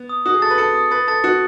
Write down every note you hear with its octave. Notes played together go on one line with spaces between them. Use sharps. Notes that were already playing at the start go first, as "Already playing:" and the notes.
Already playing: B3
D#6
F#4 D#6
G#4
A4 A6
B4
A4 C#7
D#6
B4 A6
A4 A6
F#4 C#7